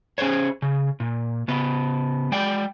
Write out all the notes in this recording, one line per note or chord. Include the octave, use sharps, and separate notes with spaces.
C#4 E4 G#4 C5 C#5
C#3
A#2
C#3 B3
G#3 D5 G5